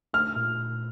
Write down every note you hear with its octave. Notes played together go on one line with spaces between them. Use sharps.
A3 F6
A#2